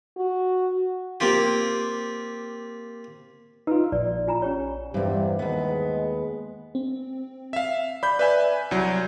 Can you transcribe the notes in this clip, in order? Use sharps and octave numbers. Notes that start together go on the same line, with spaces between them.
F#4
A#3 C4 F4 G4
D#4 F4 B4 E6
A#1 D5
F4 G#5 A#5
C#4 G4 C#5
E2 G2 C3
D#2 G#3 B3
C4
E5 F5
D5 B5 G6
B4 D5 E5 G#5 G6
C2 F#3